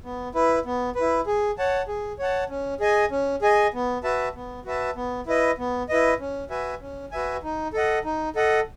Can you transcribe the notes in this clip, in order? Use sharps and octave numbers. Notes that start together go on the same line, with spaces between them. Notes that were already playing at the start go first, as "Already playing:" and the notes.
B3
E4 B4
B3
B4
E4
G#4
C#5 F#5 A5
G#4
C#5 F#5 A5
C#4
G#4 D#5 G#5
C#4
G#4 D#5 G#5
B3
F#4 B4 E5 A5
B3
F#4 B4 E5 A5
B3
E4 B4 D#5
B3
E4 B4 D#5
C#4
F#4 B4 E5 G#5
C#4
F#4 B4 E5 G#5
D#4
A4 D#5 F#5
D#4
A4 D#5 F#5